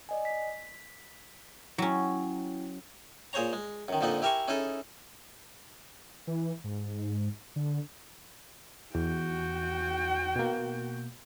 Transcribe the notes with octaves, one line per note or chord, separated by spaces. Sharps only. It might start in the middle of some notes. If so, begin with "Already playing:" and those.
D5 D#5 G#5
B6
F#3 C#4 E4 G5
A#2 G#4 C5 C#5 A#5
G#3
F#2 D#3
F2 A#2 D3 F3 D#4 D#5
E4 G4 A#4 E5 G#5 C#6
C#4 D#4 E4 G#4 A4
E3
G#2
D3
E2 F#4 G5
B2 A#3